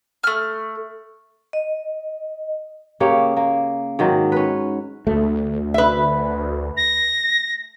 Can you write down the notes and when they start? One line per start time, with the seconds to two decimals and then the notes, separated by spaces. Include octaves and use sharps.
0.23 A3 F6
1.53 D#5
3.00 C#3 A#3 G4 C#5
3.37 A#3
3.99 G#2 D#3 F#3
4.32 C#4 B4
5.07 D2 A3
5.74 B4 E5
6.76 A#6